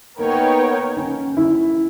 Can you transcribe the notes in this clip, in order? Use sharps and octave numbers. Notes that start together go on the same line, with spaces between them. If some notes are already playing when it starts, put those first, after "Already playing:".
A#3 B3 D#4 A#4 C#5 G5
C#4
E4